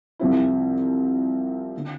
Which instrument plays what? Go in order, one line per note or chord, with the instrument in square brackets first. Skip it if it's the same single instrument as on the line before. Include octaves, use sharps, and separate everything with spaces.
[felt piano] C2 C3 F3 C4 E4
D3